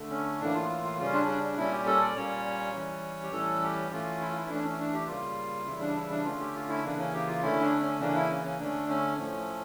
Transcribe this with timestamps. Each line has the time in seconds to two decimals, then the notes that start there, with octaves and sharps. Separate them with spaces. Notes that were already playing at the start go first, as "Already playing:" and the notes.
Already playing: D3 A3
0.10 C#4
0.40 A2 E3 A#3 D4
0.55 F4
0.69 F4
0.84 F4
0.99 C#3 G3 C#4 F4
1.13 D4
1.28 D4
1.43 D4
1.57 A#2 G3 C#4 E4
1.71 G4
1.86 A4
2.01 D5
2.15 A#2 G3 A#3 C#4 C#5
2.74 E3 G3 C#4
3.23 G4
3.32 A2 E3 G3 C#4 A4
3.62 G4
3.90 E3 A3 C#4 F4
4.21 E4
4.29 F4
4.37 E4
4.49 E3 A3 C#4 D4
4.64 C#4
4.79 D4
4.93 G4
5.07 C#3 G3 A#3 F4
5.66 C#3 E3 G3 E4
5.81 D4
5.96 E4
6.10 D4
6.24 D3 A3 C#4 F4
6.40 G4
6.55 F4
6.69 E4
6.83 C#3 E3 A#3 D4
6.99 C#4
7.13 G4
7.27 F4
7.42 D3 A3 C#4 E4
7.61 D4
7.82 C#4
8.00 C#3 E3 A#3 C#4 D4
8.15 E4
8.30 C#4
8.44 C#4
8.59 D3 A3 C#4 D4
8.89 C#4
9.17 A2 F3 A3 C#4